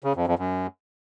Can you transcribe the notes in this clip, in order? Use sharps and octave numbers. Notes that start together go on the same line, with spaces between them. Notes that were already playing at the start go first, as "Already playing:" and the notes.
C#3
F2
F2
F#2